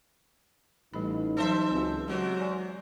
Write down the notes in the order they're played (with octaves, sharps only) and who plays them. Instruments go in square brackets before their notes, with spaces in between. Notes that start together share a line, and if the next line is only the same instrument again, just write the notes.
[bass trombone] A1 [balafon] G3 B5 [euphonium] D#4
[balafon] E3 F#3 C#5 [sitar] A4 C5 E5
[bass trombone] C#2 [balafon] C4 F#4
[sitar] C3 F#4 [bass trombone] F#3 [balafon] G#3
[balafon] D5 G#5